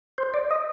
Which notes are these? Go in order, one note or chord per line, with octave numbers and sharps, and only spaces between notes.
C5
D5
D#5